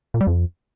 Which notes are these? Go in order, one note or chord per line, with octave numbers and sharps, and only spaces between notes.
A#2
G3
F2